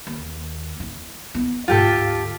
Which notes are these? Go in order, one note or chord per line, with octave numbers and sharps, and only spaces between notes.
D#2
E4
B3 E4
D2 G#2 F4 G4 A4